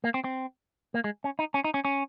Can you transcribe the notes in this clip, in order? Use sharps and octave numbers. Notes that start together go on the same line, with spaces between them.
A#3
C4
C4
A#3
G#3
C#4
D#4
C#4
D#4
C#4
C#4